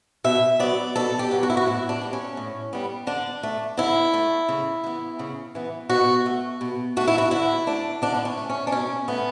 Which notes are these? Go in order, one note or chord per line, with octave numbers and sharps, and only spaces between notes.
B2 E5
F#3 B3 D5
B2 A4
G4
F#3 B3
F#4
E4
F#4
A2 E4
D4
G3 B3
C#4
A2
G3 B3
D3 D4
A3
D3 E4
A3
C#3
E3 B3
C#3
E3 B3
B2 F#4
A3
B2
A3 F#4
E4
F#4
D3 E4
A3 D4
D3 D4
B3
C#4
A3
C#4
D4
B2 C#4
A3 B3